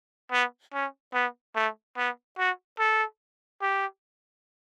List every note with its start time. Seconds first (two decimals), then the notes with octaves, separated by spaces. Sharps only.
0.32 B3
0.74 C#4
1.14 B3
1.55 A3
1.97 B3
2.38 F#4
2.79 A4
3.61 G4